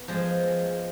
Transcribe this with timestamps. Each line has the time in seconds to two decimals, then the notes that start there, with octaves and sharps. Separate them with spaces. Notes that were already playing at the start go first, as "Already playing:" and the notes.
Already playing: B3
0.08 F3 G#3